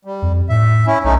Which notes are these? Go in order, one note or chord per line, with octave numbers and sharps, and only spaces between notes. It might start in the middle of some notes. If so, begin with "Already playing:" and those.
G3
F2
A2 E5
C#4 E4
B1 A3 C#4 D#4